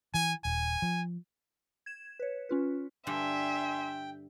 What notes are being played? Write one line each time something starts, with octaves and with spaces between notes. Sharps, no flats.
E3 G#5
D#1 G#5
F3
G#6 E7
B4 C#5
C#4 F4 B4
G2 D3 G3 E5 G5 G#5 C6